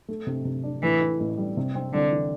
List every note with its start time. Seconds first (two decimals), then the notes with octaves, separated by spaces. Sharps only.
0.08 A3
0.27 C3
0.45 C3
0.64 D4
0.82 A2 E3
1.01 E4
1.20 A1
1.37 G3
1.57 C3
1.75 C4
1.93 C2 D3
2.12 E3